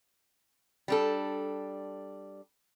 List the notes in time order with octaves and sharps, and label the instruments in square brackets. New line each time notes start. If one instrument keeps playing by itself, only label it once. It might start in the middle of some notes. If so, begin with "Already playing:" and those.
[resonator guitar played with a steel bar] G3 D4 A4